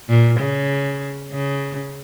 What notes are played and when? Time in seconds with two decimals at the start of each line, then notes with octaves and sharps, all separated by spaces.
0.09 A#2
0.40 C#3
1.32 C#3